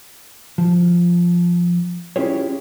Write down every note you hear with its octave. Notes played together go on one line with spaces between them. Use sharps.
F3
C#4 E4 F4 G4 G#4 C#5